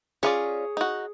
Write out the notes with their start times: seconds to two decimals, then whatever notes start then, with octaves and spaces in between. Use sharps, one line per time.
0.23 C#4 F4 G#4 C#5 D5
0.77 D#4 F#4